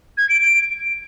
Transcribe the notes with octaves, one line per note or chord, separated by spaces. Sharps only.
G#6
D7
D7